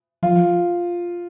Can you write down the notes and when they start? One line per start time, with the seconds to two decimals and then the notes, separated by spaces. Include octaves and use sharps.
0.23 F3 F4